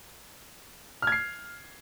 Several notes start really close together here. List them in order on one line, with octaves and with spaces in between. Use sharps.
F6 G#6 C7